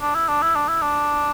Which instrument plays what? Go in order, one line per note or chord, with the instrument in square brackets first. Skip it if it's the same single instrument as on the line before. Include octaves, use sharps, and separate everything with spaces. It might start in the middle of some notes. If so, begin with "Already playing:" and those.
[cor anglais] D4
E4
D4
E4
D4
E4
D4